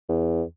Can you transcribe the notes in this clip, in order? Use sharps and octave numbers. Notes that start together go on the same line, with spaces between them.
E2